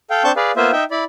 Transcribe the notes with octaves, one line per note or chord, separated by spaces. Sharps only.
A4 F5 G5
C4 D4 A5 C#6 G6
G#4 B4 D5 F5
A#3 B3 F4 C5 E5
D#4 E5 G5
E4 D5 B5